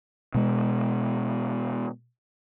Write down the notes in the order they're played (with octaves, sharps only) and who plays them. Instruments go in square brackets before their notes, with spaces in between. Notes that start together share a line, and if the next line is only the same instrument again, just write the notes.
[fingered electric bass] B2 G#3